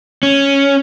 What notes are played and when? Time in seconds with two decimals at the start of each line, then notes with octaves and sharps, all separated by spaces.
0.23 C#4